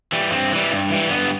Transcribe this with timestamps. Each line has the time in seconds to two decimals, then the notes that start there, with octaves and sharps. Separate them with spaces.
0.12 E3 G3
0.32 G2 C4
0.52 E3 G3
0.72 G2
0.90 E3 G3
1.10 G2 B3